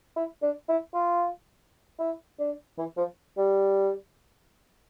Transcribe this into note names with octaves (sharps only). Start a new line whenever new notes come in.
E4
D4
E4
F4
E4
D4
E3
F3
G3